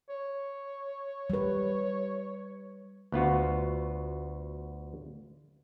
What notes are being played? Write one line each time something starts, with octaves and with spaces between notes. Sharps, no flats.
C#5
G3 B4
D2 B3 F4 F#4